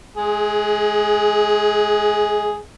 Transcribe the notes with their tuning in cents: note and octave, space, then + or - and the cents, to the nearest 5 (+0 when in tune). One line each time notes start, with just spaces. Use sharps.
G#3 +30 G#4 +0